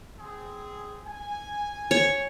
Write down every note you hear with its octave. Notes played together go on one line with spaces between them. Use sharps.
C4 G#4
G#5
C#5